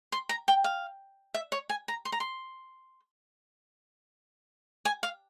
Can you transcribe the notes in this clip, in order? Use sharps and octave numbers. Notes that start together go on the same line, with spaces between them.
C6
A#5
G5
F5
E5
C#5
G#5
A#5
C6
A#5
C6
G#5
F5